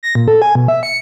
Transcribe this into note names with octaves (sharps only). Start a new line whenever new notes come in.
A#6
A#2
A4
G#5
B2
E5
C#7